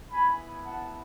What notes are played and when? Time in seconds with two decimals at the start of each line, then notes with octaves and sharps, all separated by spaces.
0.11 B3 E4 G#5 B5
0.64 F#5 A5